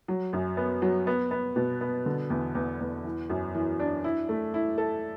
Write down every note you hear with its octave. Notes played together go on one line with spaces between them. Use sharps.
F#3
F#2
B3
F#3
B3
B3
B2
B3
D3
E2
E2
E2
E3
F#2
E3
D4
E4
A3
E4
A4